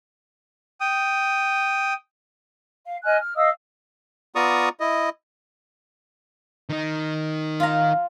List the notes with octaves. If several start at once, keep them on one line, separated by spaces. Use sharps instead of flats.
G5 D#6
F5
D#5 G#5 F6 F#6
F6
D#5 F5 D#6 E6
B3 F4 D5 A#5 C#6 D#6
E4 D#5
D#3 D#4
F4 A#5